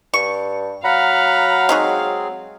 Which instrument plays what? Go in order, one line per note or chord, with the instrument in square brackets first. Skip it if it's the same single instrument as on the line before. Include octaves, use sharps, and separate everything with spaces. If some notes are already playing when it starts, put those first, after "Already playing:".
[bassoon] G2 [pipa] C#6
[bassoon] F#3 [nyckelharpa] F5 [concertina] F#5 A#5 B5
[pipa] G#3 D#4 F#4 [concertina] C4 G#4